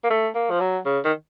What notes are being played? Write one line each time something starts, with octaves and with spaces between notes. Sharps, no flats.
A#3
A3
A#3
F3
F#3
C#3
D#3